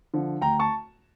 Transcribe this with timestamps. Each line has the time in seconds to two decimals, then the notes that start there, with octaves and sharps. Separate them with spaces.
0.14 D3 F3
0.41 D2 G5 A#5
0.59 A5 C#6